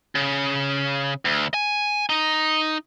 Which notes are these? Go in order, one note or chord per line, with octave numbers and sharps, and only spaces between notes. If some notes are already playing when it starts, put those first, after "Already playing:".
C#3
D2
G#5
D#4